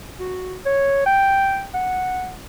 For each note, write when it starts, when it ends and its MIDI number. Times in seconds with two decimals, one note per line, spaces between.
0.20 0.55 66
0.66 1.04 73
1.06 1.64 79
1.74 2.31 78